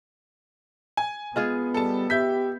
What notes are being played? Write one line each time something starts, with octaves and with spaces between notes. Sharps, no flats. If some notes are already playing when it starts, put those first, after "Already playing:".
G#5
G#3 B3 F4 G#4
G3 A4 A5
G4 E5 G6 B6